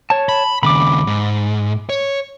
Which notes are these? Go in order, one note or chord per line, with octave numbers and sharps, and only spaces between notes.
C#5 A5
B5
D#2 C#3 B5 D6
G#2
C#5